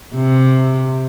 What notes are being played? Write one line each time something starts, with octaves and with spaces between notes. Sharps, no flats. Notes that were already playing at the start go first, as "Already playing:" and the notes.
C3